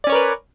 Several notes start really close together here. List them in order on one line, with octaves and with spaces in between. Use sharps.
D5 C#4 C#5 A#4 B4